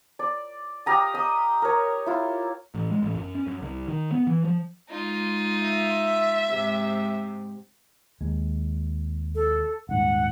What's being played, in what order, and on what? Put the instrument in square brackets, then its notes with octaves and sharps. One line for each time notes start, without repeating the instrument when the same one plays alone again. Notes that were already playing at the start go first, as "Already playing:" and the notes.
[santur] D5
G4 F5 A#5 D#6
D#5 D#6
A#4 C#5
E4 F4
[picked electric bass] A1
G#3
A1
F#2
C#4
F#2
C2
D#3
B3
E3
F3
[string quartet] G#3 D#4 F4
[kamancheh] E5
[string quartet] G#2 C3
[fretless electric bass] D#2 G#3
[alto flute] A4
[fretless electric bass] D#1 G#2 [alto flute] F#5